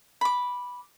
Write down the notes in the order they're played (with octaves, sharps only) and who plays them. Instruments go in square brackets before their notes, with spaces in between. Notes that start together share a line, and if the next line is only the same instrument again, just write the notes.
[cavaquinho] B5 D6